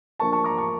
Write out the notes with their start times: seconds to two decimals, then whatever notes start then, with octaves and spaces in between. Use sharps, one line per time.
0.19 F3 A#3 D4 A5 C#6
0.32 A5 C#6
0.44 A#5 D6
0.58 A5 C#6